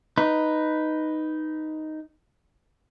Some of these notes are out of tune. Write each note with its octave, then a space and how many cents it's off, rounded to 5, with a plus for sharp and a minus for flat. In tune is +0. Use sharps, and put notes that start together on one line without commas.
D#4 +0 B4 +0